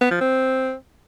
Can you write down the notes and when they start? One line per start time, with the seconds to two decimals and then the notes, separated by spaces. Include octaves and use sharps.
0.01 B3
0.11 F3
0.21 C4